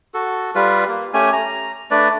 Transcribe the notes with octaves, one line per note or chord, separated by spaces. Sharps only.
F#4 A4
G3 F4 B4
A#3
A3 C#4 G4 G#5
A#5
A3 D4 B4 D5